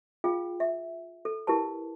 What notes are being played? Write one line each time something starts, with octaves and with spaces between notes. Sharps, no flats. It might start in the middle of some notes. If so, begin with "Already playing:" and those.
F4 G#4 F5 G5
E5
A4
E4 G4 A#4 B4 A5